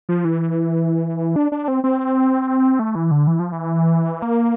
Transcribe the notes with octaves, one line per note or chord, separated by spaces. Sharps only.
F3
E3
D4
D4
C4
C4
A3
E3
D3
E3
F3
E3
A#3